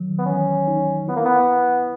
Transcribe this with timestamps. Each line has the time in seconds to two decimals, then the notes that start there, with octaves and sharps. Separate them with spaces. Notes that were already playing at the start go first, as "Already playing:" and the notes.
Already playing: D#3 F#3
0.19 B3
0.26 E3 C#4
0.68 D#4
1.08 B3 E4
1.16 A#3
1.25 B3